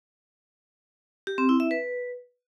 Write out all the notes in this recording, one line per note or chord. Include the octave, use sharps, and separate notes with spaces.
G4
C4
E4
E5
B4